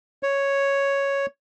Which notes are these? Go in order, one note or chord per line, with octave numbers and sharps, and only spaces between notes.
C#5